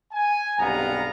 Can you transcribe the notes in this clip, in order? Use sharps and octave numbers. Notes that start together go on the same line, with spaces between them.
G#5
B1 G2 C3 B3 F5 A#5